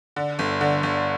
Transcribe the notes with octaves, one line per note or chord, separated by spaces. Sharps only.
D3
G1
D3
G1